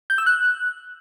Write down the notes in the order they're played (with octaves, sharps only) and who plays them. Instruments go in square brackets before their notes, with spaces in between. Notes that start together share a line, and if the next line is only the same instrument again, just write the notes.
[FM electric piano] G6
E6
F#6